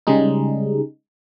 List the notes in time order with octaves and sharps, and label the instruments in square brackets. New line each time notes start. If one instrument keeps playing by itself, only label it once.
[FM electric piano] C#3 G3 G#3 D#4